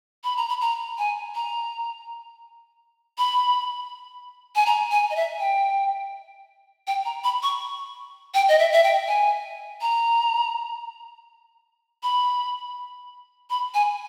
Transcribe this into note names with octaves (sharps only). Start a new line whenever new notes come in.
B5
A#5
B5
A#5
G#5
A#5
B5
G#5
A#5
G#5
D#5
E5
G5
G5
A#5
B5
C#6
G5
D#5
E5
E5
G5
G#5
A#5
B5
B5
G#5